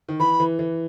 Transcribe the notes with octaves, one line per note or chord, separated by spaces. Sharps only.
D#3
E3 B5
E3
E3